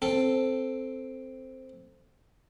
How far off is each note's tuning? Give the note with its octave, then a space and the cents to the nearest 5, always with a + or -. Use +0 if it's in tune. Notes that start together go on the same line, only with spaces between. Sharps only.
C4 +0 A4 +0